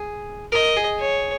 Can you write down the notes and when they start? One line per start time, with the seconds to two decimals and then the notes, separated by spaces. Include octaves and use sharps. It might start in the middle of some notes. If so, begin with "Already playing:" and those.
Already playing: G#4
0.52 A#4 D#5
0.77 G#4
1.00 C#5